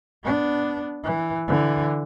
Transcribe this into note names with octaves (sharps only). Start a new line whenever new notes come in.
B3 D4
E3
D3 E3